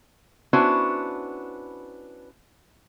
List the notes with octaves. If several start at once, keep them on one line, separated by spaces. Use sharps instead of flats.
B3 C#4 D4 E4 F#4 C5